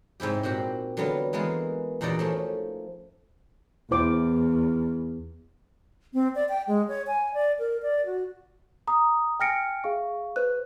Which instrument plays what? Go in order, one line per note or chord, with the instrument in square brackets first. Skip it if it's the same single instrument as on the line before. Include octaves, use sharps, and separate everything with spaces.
[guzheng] G#2 C3 E4 G4
A#2 C4 F#4 G4
D3 F#3 G3 B3 F4
E3 G#3 A#3 B3 F4
E2 A#2 D#4 F#4 D5 A#5
F3 A3 C#4
[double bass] E2 [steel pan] E4 C5 D6
[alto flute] C4
D5
G5
G#3
C#5
G#5
D5
A#4
D5
F#4
[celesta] A#5 D#6
G5 G#5 F6 A#6 C#7 D7
G#4 E5 F5 C#6
B4 C5 F#6